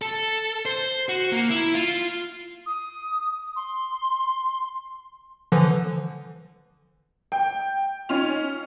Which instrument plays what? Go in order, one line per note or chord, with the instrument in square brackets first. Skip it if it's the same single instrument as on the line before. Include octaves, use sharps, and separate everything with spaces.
[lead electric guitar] A4
C5
F#4
A#3
E4
F4
[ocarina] D#6
C6
[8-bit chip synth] D3 E3 F3
[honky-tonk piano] G5
C#4 D#4 F4 F7